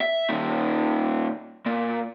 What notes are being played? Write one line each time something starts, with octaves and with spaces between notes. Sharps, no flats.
E5
A#2 D#3
A#2